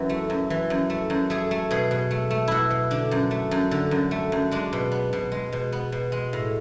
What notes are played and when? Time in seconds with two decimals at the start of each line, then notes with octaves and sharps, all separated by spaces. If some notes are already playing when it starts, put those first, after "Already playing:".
Already playing: F#2 E3 F#4
0.09 A3
0.30 F#2
0.50 E3
0.70 F#2
0.90 A3
1.10 F#2
1.30 A3 G#4
1.51 A3
1.71 B2 G#4
1.91 B2
2.11 A3
2.31 A3
2.48 B2 E4 F#4
2.70 B2
2.91 D3 D4
3.11 F#2
3.31 A3
3.51 F#2
3.71 D3
3.91 F#2
4.11 A3
4.32 F#2
4.51 G#3 D4
4.73 B2
4.92 B3
5.13 B2
5.32 G#3
5.52 B2
5.72 B3
5.92 B2
6.12 G#3
6.33 A2